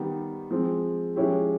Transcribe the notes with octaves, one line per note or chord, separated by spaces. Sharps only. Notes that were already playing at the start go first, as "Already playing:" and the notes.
Already playing: D#3 G3 B3 D#4 G4
F3 G#3 C4
F3 G#3 C#4 E4 G4